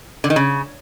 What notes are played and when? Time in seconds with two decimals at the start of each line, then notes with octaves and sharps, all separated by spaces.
0.24 D3
0.30 D#3
0.36 C#3